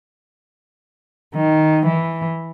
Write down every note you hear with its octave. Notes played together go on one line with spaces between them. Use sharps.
D#3
E3